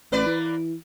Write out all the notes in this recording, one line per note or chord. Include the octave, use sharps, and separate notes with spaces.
A1 A#3 B4 D5
E3